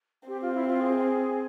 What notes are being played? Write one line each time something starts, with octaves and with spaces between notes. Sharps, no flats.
C4 G4
F4
E4
F4
G#4